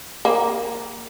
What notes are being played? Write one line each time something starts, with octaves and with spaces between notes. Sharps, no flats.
A#3